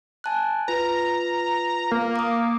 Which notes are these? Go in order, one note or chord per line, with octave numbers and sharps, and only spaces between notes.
G#5 A5 F#6
F4 B4 A#5
A#3
D6 D#6